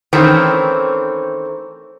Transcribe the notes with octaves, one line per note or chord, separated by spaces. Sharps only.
D#3 E3 A3 C4 C#4